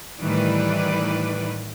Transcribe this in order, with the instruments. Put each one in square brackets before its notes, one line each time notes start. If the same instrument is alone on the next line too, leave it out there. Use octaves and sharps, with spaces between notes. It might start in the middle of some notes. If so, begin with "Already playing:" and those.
[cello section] A2 D#3 E3 G3 B4 D5